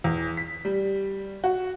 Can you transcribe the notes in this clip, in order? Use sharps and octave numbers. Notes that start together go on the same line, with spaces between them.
E2
B6
G3
F#4